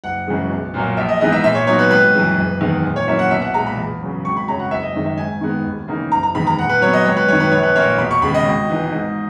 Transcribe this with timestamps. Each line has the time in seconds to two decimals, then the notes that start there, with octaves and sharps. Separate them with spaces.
0.04 F#1 F#5
0.27 F#2 C#3 E3 G#3
0.50 B1
0.74 A#2 F#3 A#3
0.97 A#1 E5
1.08 D#5
1.20 G#2 E3 G#3 B3 D#5
1.32 E5
1.44 A#2 E5
1.55 C#5
1.67 F#3 B3 D#4 C#5
1.79 B4
1.90 G#1 B4
2.14 F#2 E3 G#3
2.37 F#1
2.61 E2 D#3 G#3
2.83 A#2
2.96 C#5
3.07 F#3 A#3 C#4 E4 E5
3.19 F#5
3.31 B1 E5
3.42 F#5
3.54 A#2 G#3 A#5
3.66 B5
3.77 E2
4.01 C#3 F#3
4.24 G#1 C#6
4.37 B5
4.48 F#2 C#3 F#3 C#4 A#5
4.59 F#5
4.71 F#1 E5
4.83 D#5
4.94 F#2 D#3 G#3
5.06 E5
5.17 G#2 G#5
5.41 D#3 G#3 B3
5.65 D#2
5.88 C#3 E3 A#3 D#4
6.12 F#1 A#5
6.23 A#5
6.34 E2 D#3 G#3 B5
6.47 A#5
6.58 A#2 F#5
6.69 B4
6.81 F#3 B3 C#5
6.93 D#5
7.05 G#1 C#5
7.17 B4
7.28 F#2 D#3 C#5
7.40 B4
7.52 A#1 C#5
7.63 B4
7.76 A#2 A#3 C#5
7.98 E1 B5
8.11 C#6
8.22 D#2 C#3 G#3 B5
8.34 D#5
8.46 G#1
8.70 G#2 E3
8.92 G#2